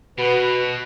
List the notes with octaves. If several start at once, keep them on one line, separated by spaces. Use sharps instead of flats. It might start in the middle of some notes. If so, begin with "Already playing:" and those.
B2 F#4 B4